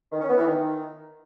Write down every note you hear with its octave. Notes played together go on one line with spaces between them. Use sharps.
D#3
C#4
B3
E3
D#3